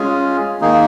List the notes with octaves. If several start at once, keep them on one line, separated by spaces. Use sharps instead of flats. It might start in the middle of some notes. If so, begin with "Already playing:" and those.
Already playing: G#3 C#4 F4 G#4
D#3 A#3 D#4 G#4